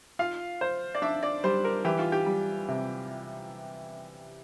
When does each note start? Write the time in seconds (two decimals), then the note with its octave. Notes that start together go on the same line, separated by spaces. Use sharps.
0.19 F4 F5
0.61 C5
0.94 D5
1.02 D4 E5
1.23 D5
1.44 G3 C5
1.64 A#4
1.85 E3 G4
1.99 F4
2.12 G4
2.26 G3
2.68 C3